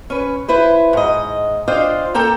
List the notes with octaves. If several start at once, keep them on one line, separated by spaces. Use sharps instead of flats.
C#4 B4
E4 B4 C5
G#2 D#5
D4 F4 C5 D#5 F5 G5
A#3 A4 G5 A#5